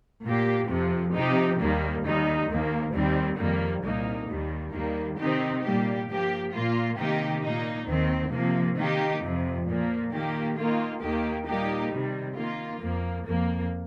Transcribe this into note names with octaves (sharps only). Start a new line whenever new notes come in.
A#2 A#3 G4
F2 C3 F3
C3 F3 D#4 G4
D#2 D#3 G3 A#3
D#2 D#3 G3 D#4
D#2 D#3 A#3
D#2 D#3 G3 C4
F2 D#3 G3 A#3
C2 A#2 A#3 D#4
D#2 D#3 G3
D#2 D#3 G3 A#3
C3 D#3 C4 D#4 G4
A#2 G3 A#3 G4
G2 F3 A#3 G4
A#2 A#3 F4
C3 D#3 A#3 D#4 G4
A#2 A#3 D#4
D#2 D#3 C4
C3 F3 A#3
D#3 A#3 D#4 G4
F2 C3 F3
A#2 F3 A#3
D#3 A#3 G4
D#3 A#3 F4
D#2 D#3 A#3 G4
A#2 G3 A#3 D#4 G4
C3 D#3 G3
D#3 A#3 F4
F2 F3 A#3
F2 F3 A#3